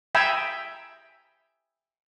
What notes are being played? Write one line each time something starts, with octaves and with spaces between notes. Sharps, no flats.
E5 G5 G#5 A#5 B5 E6